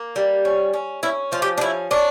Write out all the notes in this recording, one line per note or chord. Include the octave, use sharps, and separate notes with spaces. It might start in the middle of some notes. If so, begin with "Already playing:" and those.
Already playing: A#3
G3
C#4
C#4
C#4 E4
F3 F4
G4
D4
C#4 E4
C#4 D4